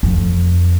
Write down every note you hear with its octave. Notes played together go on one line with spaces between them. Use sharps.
F2